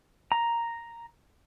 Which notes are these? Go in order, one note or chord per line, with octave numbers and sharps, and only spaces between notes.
A#5